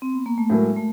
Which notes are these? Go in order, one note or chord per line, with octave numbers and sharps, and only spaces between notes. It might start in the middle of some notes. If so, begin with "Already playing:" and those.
C4
B3
A#3
A3
A2 F#3 G#3 A#3
A3